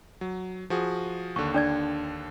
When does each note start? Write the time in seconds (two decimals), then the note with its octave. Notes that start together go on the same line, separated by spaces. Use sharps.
0.21 F#3
0.70 F3 F#4 G#4
1.36 D#2 D3 C#6
1.54 D4 D5 G#6